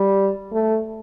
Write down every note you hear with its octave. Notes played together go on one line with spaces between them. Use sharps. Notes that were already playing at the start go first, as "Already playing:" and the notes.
Already playing: G3
A3